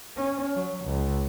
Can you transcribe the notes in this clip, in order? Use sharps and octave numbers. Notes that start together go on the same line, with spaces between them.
C#4
F#3
C#2